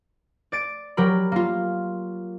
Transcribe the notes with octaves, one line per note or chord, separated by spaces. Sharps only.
D5 A6 D7
F#3 G4 A#4 B5
A#3 F4